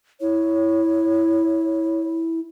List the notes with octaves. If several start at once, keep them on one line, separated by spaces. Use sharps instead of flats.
E4 C#5